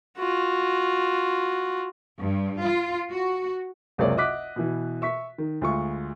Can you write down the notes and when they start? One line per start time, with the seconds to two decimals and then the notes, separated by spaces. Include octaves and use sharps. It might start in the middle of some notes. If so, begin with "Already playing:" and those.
0.18 F4 F#4
2.20 G2
2.63 F4
3.11 F#4
3.98 F#1 C#2 C3 A#3 C#5 D5
4.17 D#5 E5 F#5 D6 F#6 B6
4.56 B2 E3
5.02 E5 C#6 B6
5.38 D#3
5.61 D2 G#3 F4 C#6